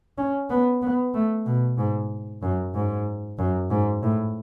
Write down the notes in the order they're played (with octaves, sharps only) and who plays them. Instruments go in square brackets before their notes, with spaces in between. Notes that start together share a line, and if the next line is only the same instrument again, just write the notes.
[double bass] C#4
B3
B3
A3
B2
G#2
F#2
G#2
F#2
G#2
A2